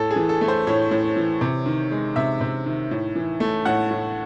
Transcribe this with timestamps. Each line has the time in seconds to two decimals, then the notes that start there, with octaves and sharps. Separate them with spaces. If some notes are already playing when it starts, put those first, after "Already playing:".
Already playing: A2 A4
0.11 G#4
0.16 E3
0.29 A4
0.41 A3
0.48 C5
0.67 A2 C#5
0.91 A2
1.16 E3
1.41 C3
1.66 D#3
1.92 G#3
2.16 C3 E5
2.41 C3
2.66 D#3
2.91 A2
3.15 E3
3.40 A3
3.65 A2 F#5
3.91 A2